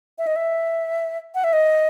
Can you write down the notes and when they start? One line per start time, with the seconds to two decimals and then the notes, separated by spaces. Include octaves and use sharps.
0.18 E5
0.27 D#5
0.36 E5
1.35 F#5
1.44 E5
1.53 D#5